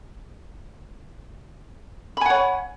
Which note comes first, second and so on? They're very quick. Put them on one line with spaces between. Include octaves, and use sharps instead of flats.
B5 G#5 F#5 C#5